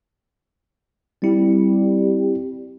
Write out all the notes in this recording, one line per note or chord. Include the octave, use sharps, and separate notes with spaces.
G3 C4 E4